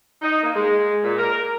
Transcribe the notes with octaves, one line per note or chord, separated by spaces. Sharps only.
D#4
A#3
G#3
A#2
A#4